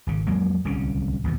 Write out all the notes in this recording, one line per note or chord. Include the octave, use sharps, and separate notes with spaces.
G#1 C#3
F2 F#3 G#3 A#3
D1 C2 C#3 C#4
A1 D#2 B2